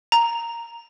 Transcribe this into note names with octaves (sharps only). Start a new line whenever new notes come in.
A#5